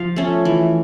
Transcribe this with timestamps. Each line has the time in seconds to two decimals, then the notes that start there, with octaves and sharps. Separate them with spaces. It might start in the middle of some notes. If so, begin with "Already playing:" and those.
Already playing: F3 F5
0.16 A3 C#4
0.45 E3